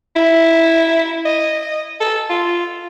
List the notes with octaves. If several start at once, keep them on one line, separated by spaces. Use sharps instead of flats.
E4
D#5
A4
F4